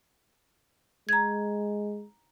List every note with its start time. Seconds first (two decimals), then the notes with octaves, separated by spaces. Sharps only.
1.09 G#3 A#5 G#6